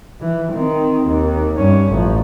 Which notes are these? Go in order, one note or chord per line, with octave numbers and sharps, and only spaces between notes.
E3
D#3 C4
D#2
G2 C#4
A1 F3